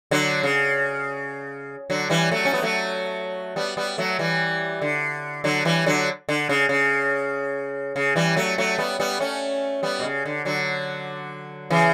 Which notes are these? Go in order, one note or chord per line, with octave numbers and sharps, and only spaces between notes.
D3 F#3
C#3
D3 F#3
E3 G3
F#3 A3
C#4
B3
F#3 A3
G3 B3
G3 B3
F#3 A3
E3 G3
D3
D3 F#3
E3 G3
D3 F#3
D3
C#3
C#3
C#3
E3 G3
F#3 A3
F#3 A3
G3 B3
G3 B3
A3 C#4
G3 B3
B2
C#3
D3
D3 F#3
C#3 E3